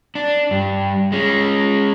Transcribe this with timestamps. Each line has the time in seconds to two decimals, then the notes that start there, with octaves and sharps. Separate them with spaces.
0.15 D4
0.51 G2
1.12 G#3 C#4